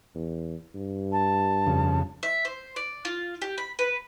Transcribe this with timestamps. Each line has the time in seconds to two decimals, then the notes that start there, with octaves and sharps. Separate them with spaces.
0.15 E2
0.75 G2
1.12 A5
1.66 F2 C#3
2.23 E5
2.45 C5
2.76 D5
3.05 F4
3.42 G4
3.58 B5
3.79 B4